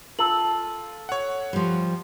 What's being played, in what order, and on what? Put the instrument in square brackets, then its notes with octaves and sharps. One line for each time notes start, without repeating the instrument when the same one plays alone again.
[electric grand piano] F4 [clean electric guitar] A4 [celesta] A5 E6 F#7
[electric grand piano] C#5 F#5
[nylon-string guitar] F3 G3